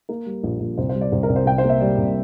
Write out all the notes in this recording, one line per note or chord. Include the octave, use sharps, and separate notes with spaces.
A#3 A#4
G3
A#1
A#1
C2 C5
C5
G3
D5
C2 C5
A#4
C2
C5
C2 G5
C5
A#3
E5
G3 D5
C2